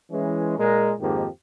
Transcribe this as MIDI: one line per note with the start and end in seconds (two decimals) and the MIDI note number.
0.11 0.57 52
0.11 0.57 56
0.11 0.57 61
0.58 0.93 46
0.58 0.93 56
0.58 0.93 70
1.00 1.27 41
1.00 1.27 44
1.00 1.27 51
1.00 1.27 53
1.00 1.27 58
1.00 1.27 67